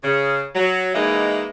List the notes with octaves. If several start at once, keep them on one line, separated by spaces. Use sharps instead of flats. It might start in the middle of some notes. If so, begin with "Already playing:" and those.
C#3
F#3
E3 G#3 A#3 D#4 E4